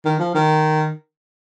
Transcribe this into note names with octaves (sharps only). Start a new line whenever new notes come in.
D#3
F3
D#3